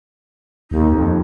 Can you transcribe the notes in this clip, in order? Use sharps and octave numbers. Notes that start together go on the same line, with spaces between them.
D#2 D#4
F2